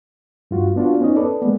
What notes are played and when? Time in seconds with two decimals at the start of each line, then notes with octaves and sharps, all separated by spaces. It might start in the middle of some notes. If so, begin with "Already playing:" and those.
0.51 G2 F4 F#4
0.76 B3 D4 F4 F#4
1.01 B3 C#4 D#4 D#5
1.16 A4 B4 D5
1.42 G#3 A#3 B3